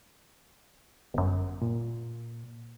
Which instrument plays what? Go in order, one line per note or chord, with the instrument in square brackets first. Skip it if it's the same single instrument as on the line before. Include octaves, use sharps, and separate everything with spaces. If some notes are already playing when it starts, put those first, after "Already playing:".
[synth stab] G1 F#2
[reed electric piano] A#2